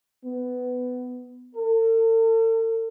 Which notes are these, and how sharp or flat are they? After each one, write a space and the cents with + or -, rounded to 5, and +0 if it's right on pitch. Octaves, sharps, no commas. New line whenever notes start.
B3 +15
A4 +45